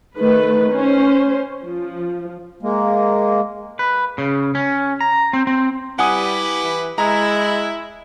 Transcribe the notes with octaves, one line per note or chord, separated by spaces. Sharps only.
D#3 A3 B4
C#4 C5
F3
G#3 A#3
B4
C#3
C#4
A#5
C4
C4
G3 E4 G4 B4 F#5 G#5 D#6
E3
G#3 E4 A#5